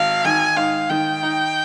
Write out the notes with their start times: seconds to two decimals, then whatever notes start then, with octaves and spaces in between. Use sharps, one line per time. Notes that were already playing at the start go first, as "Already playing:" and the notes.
Already playing: G#1 F5
0.24 D#3 G#5
0.56 G#2 F5
0.90 D#3 G5
1.23 D#4